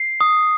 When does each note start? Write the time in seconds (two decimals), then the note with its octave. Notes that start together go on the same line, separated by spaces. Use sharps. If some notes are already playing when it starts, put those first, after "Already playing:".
Already playing: C7
0.21 D#6